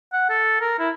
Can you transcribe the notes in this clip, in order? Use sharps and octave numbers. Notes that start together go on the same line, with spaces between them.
F#5
A4
A#4
E4